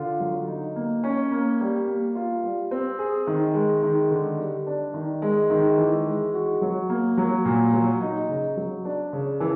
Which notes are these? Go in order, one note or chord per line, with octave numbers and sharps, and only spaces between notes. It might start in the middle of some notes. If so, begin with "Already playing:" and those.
Already playing: D3 F4
F#3
D#4
A#3
C#4
A#3
G3
A#3
F4
G3
C4
G#4
D#3
G#3
D#3
D3
G3
D4
D#3
G#3
D#3
E3
G#3
F#4
F#3
A#3
F#3
A#2
F#3
D#4
C#3
F#3
D4
C#3
E3